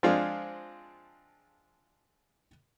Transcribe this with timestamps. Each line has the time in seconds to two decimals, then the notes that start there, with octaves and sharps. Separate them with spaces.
0.03 F3 G#3 C4 D4 F4 G#4